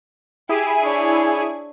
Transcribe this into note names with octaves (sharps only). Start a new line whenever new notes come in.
E4 G4 G#4 E5 G#5
D4 C#5